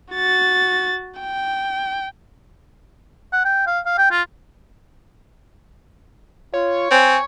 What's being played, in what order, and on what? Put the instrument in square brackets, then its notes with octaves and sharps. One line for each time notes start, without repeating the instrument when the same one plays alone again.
[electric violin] F#4 A6
G5
[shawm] F#5
G5
F5
F5
G5
F4
[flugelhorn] F4 [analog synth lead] C#5
[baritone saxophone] C4 [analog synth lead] C#5 [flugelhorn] G#5